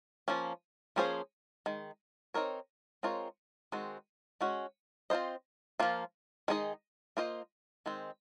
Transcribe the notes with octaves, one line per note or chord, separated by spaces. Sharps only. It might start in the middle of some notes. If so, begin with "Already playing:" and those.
F3 A#3 C#4
F3 A#3 C#4 G#4 C5
D#3 G#3
C4 D#4 A#4 C#5
G#3 C4 F4 A#4 C#5
D#3 G#3 C4 F#4
G#3 C#4 F#4
C4 F4 C5 D#5
F3 A#3 F4
D#3 G#3 D#4 G#4 D#5
A#3 F4 C5 D#5
D#3 G#3 C4